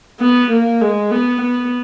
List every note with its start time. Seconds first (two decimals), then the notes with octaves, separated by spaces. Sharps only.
0.20 B3
0.51 A#3
0.81 G#3
1.11 B3
1.41 B3